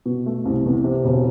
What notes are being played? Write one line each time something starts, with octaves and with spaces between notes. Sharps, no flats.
B2
A3
C2
E2
C3
E1